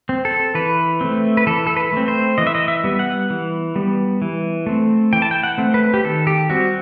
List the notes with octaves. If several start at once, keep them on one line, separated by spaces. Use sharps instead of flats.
C4
A4
E3 B4
A3 C4
B4
E3 A4
A4
B4
A3 C4
C5
E3 D#5
E5
D#5
E5
G3 B3
F#5
E3
G3 B3
E3
A3 C4
E3 G5
A5
G5
F#5
A3 C4
B4
G4
D#3 A4
G4
G3 C4 F#4